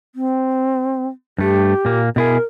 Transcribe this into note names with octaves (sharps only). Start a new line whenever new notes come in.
C4
G2 A3 G4
A#2 A#3
B2 E4 G#4 A#4